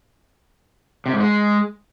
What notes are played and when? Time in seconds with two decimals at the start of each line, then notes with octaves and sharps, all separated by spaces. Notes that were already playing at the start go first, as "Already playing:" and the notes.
1.06 C3
1.13 G#2
1.20 G#3